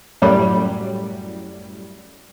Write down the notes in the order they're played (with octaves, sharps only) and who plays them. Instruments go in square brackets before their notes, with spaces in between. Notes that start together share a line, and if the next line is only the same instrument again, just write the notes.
[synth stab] F#2 A2 F#3 G3